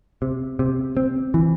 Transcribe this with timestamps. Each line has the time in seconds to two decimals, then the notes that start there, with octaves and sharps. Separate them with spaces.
0.22 C3
0.59 C3
0.97 C4
1.34 E3